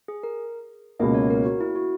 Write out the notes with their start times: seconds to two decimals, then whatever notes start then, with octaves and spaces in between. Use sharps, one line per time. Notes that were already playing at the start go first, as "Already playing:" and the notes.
0.08 G#4
0.23 A#4
0.99 C#2 B2 A#3 D#5
1.14 C#5
1.30 A#4
1.45 F#4
1.61 E4
1.76 F#4